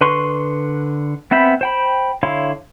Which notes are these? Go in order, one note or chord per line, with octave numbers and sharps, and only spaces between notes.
D3 B4 C6 C#6
B3 C4 E5 B5 G6
C5 G5 B5
D3 E4 C#5 F5 C6